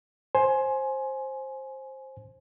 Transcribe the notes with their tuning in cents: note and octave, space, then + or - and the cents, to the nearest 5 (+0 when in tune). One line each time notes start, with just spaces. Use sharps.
C5 +15 G#5 +15